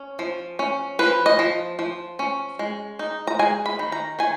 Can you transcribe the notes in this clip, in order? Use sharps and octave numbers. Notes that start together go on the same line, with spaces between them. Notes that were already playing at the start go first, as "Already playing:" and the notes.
Already playing: C#4
F3
C#4
F3 B4
D#5
F3
F3
C#4
G#3
D#4
A#5
G#3 G#5
B5
D#3
A#5
D#3 G#5